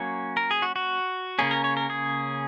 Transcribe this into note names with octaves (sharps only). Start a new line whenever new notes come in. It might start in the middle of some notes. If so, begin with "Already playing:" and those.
Already playing: F#3 A#3 C#4 C#5
A#4
G#4
F#4
F#4
C#3 A#3 C#4 G#4
A#4
C#5
A#4
G#4